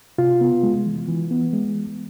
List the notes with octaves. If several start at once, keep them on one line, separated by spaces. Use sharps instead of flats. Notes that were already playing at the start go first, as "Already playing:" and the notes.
C3 F4
B3
G#3
E3
E3
B3
G#3